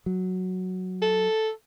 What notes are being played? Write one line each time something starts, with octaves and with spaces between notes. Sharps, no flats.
F#3
A4